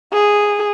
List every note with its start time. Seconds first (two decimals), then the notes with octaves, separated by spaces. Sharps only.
0.13 G#4